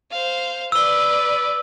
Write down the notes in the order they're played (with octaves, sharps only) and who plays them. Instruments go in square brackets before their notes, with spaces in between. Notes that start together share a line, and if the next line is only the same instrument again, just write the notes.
[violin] C5 F5
[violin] B4 D5 [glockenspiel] E6 G7